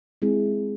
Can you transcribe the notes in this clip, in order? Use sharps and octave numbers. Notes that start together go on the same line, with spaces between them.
G#3 C4 E4 G#4